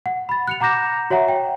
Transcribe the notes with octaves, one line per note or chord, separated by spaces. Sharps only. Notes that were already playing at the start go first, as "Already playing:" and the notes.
F#5
B5 A6
F#6 C#7 F7
F#5 A#5 D6 G6 A#6 E7
F#4 C#5 E5 F#5 A#5
G5